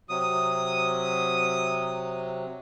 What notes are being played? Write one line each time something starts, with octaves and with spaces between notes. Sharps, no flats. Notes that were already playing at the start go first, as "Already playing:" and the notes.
C3 F#3 D#6